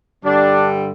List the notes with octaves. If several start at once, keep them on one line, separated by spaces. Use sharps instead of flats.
G2 D3 G3 D4